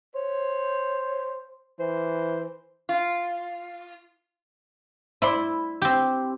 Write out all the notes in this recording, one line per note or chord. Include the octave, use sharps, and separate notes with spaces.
C5 C#5
E3 C5
F4
E4 C5 D5 C6
C4 G4